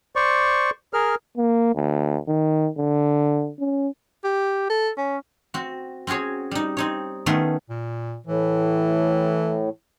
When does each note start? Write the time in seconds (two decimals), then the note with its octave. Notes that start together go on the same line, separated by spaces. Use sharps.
0.16 C5 D5 C#6
0.94 G#4 A#4 F6
1.37 A#3
1.75 D2
2.28 D#3
2.78 D3
3.59 C#4
4.24 G4
4.70 A4
4.98 C#4
5.54 C4 F#4
6.07 C4 C#4 F#4 G#4 C#5
6.51 G3 D#4
6.77 C4 D#4 C#5
7.26 D#3 A3 B3 C#4 C6
7.69 A#2
8.27 A2 E3